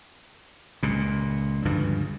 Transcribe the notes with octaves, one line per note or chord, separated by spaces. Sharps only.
C#2 A#2
D2 G2 C#3 F3